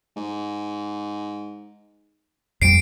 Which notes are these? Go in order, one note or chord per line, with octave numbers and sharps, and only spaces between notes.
G#2
F2 G3 C7 D7